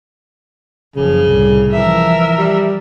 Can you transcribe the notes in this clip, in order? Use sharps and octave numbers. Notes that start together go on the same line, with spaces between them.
F#1 C#3 F3
C2 A2
E3 F3 A#4 E5
G3